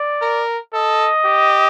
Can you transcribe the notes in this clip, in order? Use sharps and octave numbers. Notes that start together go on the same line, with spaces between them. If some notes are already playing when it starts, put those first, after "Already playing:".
Already playing: D5
A#4
A4 D#5
G4